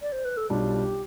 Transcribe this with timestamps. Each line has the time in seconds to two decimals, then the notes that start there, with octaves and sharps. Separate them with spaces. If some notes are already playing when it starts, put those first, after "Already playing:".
0.01 D5
0.12 C5
0.25 B4
0.37 A4
0.50 B1 B2 G3 D4 F4 G4